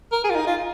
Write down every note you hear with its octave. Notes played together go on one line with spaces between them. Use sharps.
A#4
G#4
F4
D#4
F4